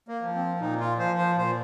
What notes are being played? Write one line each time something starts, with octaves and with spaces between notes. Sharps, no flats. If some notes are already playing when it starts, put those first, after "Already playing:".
A#3
F3
C4
A#2 D#4
F4
F3 C5
C5
A#2 C5